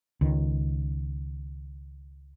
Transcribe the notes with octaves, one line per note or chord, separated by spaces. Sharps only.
C#2 D#3